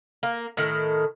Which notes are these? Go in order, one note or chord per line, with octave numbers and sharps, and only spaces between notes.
A#3
A2 D#3